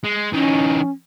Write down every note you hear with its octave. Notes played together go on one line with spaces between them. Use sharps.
G#3
E3 C#4 D#4